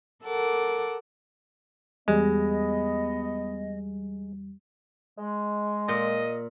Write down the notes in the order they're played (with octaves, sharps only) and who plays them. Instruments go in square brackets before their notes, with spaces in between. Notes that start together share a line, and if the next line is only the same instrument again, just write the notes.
[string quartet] A4 A#4 F#5 D6
[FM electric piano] E2 G3 [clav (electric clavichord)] G#3 [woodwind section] B3 D#5
[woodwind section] G#3
[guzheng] A#2 [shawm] D#5